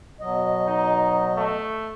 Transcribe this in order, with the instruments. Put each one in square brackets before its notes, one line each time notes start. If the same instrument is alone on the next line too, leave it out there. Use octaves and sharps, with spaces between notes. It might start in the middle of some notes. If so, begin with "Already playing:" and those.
[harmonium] B2 F#3 D#5
[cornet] D#4
A3